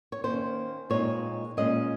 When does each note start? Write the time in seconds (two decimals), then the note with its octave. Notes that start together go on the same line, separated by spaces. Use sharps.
0.12 C#5
0.24 D#3 A#3 C#4 C5
0.90 A#2 G#3 C4 D#4 C#5
1.57 A#2 G#3 C#4 D#5